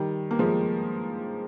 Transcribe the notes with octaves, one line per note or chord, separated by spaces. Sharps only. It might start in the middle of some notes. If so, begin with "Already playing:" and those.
Already playing: D#3 G3
A#3
F3 G#3